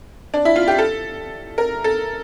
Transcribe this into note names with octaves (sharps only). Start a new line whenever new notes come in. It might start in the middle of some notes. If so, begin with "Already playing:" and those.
D4
E4
F4
G4
A4
A#4
A4